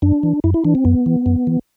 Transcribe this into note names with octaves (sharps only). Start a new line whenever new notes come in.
F#2 D4
E3
F#2 E4
E4
E3 D4
C4
F#2 B3
E3
F#2
E3